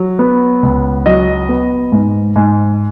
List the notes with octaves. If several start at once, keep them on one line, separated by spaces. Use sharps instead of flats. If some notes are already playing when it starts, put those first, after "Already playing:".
Already playing: F#3
B3
C#2
F#3 D#5
B3
G#2
G#2